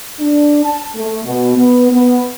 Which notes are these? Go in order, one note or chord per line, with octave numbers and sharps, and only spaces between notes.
D4
A5
A3
B2
B3
B3